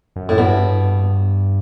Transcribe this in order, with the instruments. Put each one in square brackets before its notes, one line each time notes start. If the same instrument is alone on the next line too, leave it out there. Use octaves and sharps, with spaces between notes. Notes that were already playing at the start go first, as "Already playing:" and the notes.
[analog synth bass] F#2
[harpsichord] A2
[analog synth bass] G2 [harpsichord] B2